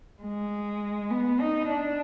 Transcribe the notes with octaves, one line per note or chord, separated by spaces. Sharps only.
G#3
B3
D#4
D4